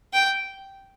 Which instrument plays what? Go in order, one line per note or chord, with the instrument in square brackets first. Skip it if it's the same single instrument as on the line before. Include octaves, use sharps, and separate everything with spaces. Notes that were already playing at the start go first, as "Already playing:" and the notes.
[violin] G5